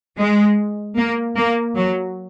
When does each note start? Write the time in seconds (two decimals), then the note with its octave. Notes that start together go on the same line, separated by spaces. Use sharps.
0.18 G#3
0.97 A#3
1.36 A#3
1.76 F#3